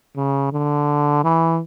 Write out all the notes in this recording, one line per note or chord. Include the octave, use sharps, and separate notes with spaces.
C#3
D3
E3